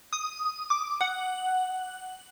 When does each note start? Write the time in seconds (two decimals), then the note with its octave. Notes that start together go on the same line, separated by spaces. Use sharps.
0.13 D#6
0.70 D6
1.01 F#5